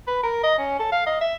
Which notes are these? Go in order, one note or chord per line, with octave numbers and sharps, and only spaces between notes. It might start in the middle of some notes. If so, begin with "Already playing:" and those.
B4
A#4
D#5
C#4
A4
F5
D#5
E5